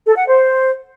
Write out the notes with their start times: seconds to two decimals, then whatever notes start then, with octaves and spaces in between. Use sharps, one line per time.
0.05 A4
0.16 F#5
0.27 C5